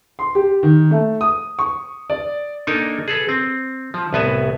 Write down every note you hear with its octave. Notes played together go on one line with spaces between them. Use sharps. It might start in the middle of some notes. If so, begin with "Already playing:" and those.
C6
G4
D#3
A3
D#6
C#6
D5
A#3 D4 D#4 A4 A#4 G#5
G#4 A4 B4
C4
F3
C2 A2 B3 B4 G#5 A5